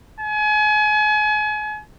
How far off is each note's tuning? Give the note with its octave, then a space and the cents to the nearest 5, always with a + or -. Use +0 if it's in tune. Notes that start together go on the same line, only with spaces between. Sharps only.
G#5 +35